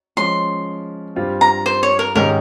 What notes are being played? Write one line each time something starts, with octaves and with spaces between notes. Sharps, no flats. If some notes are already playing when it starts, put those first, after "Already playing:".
F3 G#3 C#4 C6
G2 G3 C4 F4
A#5
C5
C#5
A#4
G#2 D#3 G#3 C#4 G4 A#4